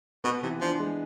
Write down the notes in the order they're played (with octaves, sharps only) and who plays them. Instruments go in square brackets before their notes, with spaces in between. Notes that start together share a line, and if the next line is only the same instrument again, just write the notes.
[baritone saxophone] B2 [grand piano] B3
[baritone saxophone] C3 [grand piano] E3
[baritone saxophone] F3 [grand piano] D4
[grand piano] G#3